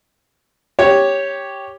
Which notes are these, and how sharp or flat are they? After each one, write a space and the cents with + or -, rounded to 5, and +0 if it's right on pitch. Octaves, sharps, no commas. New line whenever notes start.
G4 +0 C#5 +0